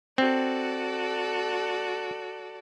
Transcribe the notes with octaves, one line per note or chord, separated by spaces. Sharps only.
C4 F#4 A4 D5